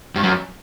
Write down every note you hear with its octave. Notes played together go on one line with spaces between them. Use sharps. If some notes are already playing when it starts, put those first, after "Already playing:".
G2
F#2